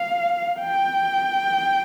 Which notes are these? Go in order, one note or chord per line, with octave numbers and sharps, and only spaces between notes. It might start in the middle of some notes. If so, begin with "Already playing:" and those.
Already playing: F5
G5